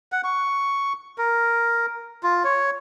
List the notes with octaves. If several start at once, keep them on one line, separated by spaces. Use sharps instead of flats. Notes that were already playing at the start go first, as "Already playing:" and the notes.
F#5
C#6
A#4
F4
C#5